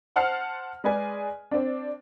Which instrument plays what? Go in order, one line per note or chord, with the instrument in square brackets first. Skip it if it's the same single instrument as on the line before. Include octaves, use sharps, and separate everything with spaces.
[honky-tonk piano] C5 F#5 A5 F6 C7
G#3 G#4 B4 D5 G#5
C4 D4